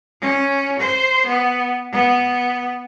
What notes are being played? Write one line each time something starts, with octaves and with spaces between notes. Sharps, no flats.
C#4
C5
B3
B3